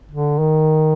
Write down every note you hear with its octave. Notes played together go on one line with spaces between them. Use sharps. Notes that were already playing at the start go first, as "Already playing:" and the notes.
D3
D#3